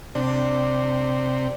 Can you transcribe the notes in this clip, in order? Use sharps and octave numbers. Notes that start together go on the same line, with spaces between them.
C3 D4